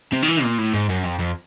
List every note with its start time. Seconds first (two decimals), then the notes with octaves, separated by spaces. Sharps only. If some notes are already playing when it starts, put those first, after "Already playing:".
0.12 C3
0.22 D#3
0.28 E3
0.43 A#2
0.58 A2
0.74 G#2
0.89 F#2
1.04 F2
1.19 F2